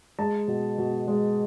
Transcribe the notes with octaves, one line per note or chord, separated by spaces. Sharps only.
G#3 A5
B2
B2
G#3